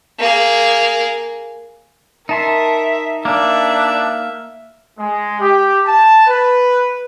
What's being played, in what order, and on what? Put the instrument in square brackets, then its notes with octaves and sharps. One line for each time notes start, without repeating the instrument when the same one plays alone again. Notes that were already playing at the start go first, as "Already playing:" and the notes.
[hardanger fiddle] A#3 G#4
[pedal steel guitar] D#4 A5 C6 [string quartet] A#4 [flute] E5
[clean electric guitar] A#3 [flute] D4 [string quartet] E5
[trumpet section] G#3
G4
A5
B4